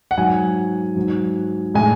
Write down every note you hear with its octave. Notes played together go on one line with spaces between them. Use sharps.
F#5
G#2 F#3 G#5
G#2 F#3
A2 G#3 G#5